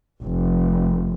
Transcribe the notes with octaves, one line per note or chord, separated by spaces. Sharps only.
F1